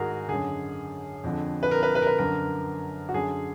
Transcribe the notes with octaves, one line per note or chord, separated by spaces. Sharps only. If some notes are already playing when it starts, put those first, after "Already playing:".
Already playing: G#2 D#3 F#4 G#4 A#4
F#2 D3 G#4
F2 D3
B4
A#4
B4
B4
A#4
B4
F#2 D3 A#4
F#4
F#2 D3 G#4